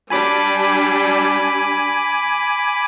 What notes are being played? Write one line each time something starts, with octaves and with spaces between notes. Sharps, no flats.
G3 D4 G#5 B5 D6